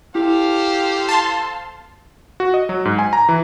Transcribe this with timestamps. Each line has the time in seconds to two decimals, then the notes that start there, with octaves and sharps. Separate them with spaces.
0.15 E4 G4 A4 C5 F5
1.09 A5 C6
2.40 F#4
2.54 D#5
2.69 F#3
2.85 G#2
2.99 G#5
3.13 A#5
3.29 E3